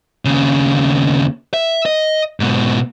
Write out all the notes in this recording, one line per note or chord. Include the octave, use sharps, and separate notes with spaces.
D#2 C#3
E5
D#5
G#2 B2